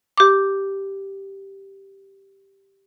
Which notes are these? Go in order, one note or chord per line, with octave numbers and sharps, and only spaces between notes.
G4 D6